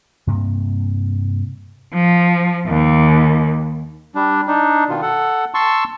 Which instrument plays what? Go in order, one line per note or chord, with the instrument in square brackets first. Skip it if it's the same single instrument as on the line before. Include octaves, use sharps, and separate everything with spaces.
[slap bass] G2 C3 A#3
[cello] F3
D#2
[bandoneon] G3 D4
D4 D#4
B2 D#3 F4
A4 F#5
A5 C6 C#6 E6